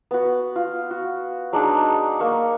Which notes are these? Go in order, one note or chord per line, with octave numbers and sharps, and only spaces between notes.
B3 F#4
F4
F#4
F#3 G#3 D4 D#4
A#3 C#6